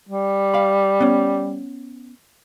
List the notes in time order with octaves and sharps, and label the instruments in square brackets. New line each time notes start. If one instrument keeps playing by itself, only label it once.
[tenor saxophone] G3
[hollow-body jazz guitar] F5 B5
B3 C#4